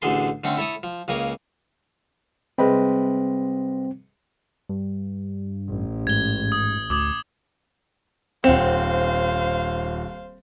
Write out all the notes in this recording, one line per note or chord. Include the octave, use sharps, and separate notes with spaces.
A1 D2 D3 G#4 A5 C6
D3 A3 C4 C#4
E4 A4 C#5 A5 D#6
F3
C#2 C#3 A#3 G#5 A#5 D6
C2 G#3 C4 B4
G2
A1
G#2 G#6 G7
D#6
D2 D6 D#6 G#6
D#1 C4 C5 F5 F#5 E7